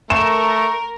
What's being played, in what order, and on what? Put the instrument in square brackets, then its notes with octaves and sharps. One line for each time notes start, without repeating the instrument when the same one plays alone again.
[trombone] A3 [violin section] A#4 [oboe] C#6 [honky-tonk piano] E7